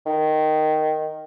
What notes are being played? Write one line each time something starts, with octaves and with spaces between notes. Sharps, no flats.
D#3